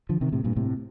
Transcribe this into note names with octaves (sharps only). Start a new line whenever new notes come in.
D3 F3
C3 D#3
A2 C3
G2 A#2
A2 C3